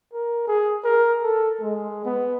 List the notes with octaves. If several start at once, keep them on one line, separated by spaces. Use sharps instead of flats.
A#4
G#4
A#4
A4
G#3
B3